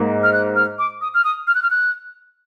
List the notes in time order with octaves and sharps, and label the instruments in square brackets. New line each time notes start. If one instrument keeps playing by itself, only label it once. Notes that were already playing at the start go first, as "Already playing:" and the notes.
Already playing: [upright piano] G#2 A#3
[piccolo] F6
F#6
F6
D6
D#6
F6
D#6
F6
F#6
F6
F#6